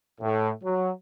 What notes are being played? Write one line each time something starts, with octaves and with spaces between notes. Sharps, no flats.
A2
F#3